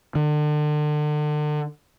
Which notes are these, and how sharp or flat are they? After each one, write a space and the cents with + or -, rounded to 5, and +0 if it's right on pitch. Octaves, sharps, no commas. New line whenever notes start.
D3 +35